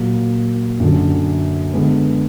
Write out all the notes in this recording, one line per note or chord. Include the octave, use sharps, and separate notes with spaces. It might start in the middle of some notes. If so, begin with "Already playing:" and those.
Already playing: A#2 F#3 A#3
F#2 D3 F#3
D3 G#3 B3